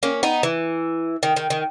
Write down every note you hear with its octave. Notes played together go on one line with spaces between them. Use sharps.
A#3 C#4
B3 D#4
E3
D#3
D#3
D#3